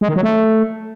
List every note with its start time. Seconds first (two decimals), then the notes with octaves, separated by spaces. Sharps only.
0.01 G#3
0.08 D#3
0.16 F#3
0.23 A3